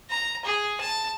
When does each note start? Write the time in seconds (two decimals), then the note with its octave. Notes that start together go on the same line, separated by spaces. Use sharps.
0.10 A#5
0.45 G#4
0.81 A5